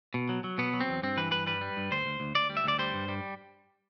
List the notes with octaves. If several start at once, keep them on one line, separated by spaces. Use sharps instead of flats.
B2
F#3
F#3
B2 B3
F#3
C4
E2
G2 C4
E3 B4
G2 B4
G3 B4
G3
G2
D2 C5
D2
D2
D2 D5
G3
E5
D2 D5
G3 C5
G2
G3